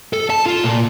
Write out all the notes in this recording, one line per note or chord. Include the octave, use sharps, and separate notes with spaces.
A4
A5
F4
A#2